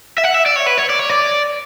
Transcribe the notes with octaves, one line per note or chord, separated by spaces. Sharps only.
E5
F#5
E5
D5
C#5
B4
C#5
D5
C#5
D5